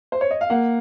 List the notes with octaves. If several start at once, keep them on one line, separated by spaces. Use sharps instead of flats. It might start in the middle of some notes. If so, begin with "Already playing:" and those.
C5
C#5
D#5
F5
A#3 F#5